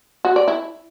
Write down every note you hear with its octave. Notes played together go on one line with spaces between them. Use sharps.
F#4
D5
E4